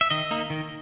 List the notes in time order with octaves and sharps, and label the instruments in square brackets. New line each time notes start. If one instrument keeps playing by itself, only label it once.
[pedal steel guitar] E5
D#3 D#5
A#3 D#4
D#3